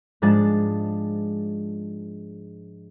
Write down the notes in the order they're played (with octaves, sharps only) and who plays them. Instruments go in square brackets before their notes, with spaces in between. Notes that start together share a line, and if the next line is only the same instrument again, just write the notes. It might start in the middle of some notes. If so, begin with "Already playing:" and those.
[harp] G#2 F3 G#3 D4 A5 A6